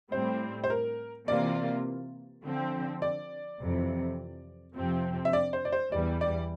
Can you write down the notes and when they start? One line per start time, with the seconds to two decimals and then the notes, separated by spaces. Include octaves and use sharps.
0.12 A2 G3 C4 C5
0.64 C5
0.70 A#4
1.28 C3 E3 A#3 F4 D5
2.44 D3 F3 C4
3.02 D5
3.60 F2 C3 E3
4.76 F2 C3 F3 C4
5.25 E5
5.33 D5
5.53 C5
5.65 D5
5.72 C5
5.91 E2 E3 G3 D5
6.21 D5